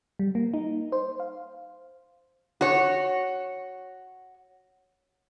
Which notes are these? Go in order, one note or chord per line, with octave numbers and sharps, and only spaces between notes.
G3
A#3
D#4
C5
F5
F#4 C#5